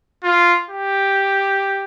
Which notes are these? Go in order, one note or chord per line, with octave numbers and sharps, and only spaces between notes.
F4
G4